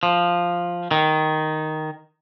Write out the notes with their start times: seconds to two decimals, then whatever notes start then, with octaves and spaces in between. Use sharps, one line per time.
0.03 F3
0.91 D#3